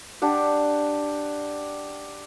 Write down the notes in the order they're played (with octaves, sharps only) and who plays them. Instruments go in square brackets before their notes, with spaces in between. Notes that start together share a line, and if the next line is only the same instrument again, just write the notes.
[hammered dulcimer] D4 G4 F#5